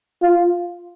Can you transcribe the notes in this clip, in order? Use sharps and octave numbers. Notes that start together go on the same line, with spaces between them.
F4